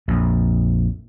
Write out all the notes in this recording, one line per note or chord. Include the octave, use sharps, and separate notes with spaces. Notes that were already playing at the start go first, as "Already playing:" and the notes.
A#1 F2